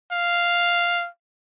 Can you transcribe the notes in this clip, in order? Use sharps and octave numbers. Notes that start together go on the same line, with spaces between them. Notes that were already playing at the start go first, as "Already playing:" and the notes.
F5